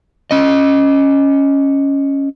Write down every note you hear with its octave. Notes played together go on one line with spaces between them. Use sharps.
C#4 D#5